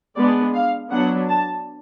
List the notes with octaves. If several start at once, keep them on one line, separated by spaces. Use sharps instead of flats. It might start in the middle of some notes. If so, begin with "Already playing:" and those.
G#3 B3 D4 D5
F5
F#3 B3 D4 F#5
A5